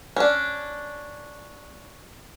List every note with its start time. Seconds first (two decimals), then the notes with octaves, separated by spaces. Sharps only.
0.16 C#4 D4